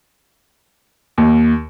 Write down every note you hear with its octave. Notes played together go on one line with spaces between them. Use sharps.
D#2